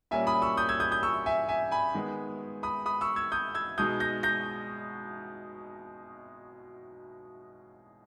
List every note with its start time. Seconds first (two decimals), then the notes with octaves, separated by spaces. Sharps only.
0.11 A#2 G3 A#3 C#4 E5 G#5
0.27 B5 D#6
0.42 C#6 E6
0.57 D#6 G6
0.69 E6 G#6
0.80 D#6 G6
0.92 D#6 G6
1.03 C#6 E6
1.26 E5 G#5
1.49 E5 G#5
1.71 G#5 B5
1.94 D#3 G#3 B3
2.63 B5 D#6
2.86 B5 D#6
3.01 C#6 E6
3.16 E6 G#6
3.32 D#6 G6
3.55 E6 G#6
3.78 B2 G#3 D#4 D#6 G6
4.00 G6 A#6
4.23 G6 A#6